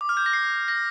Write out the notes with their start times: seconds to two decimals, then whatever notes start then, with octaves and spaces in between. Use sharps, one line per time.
0.01 D6
0.09 F6
0.17 G6
0.26 A#6
0.33 C7
0.68 A#6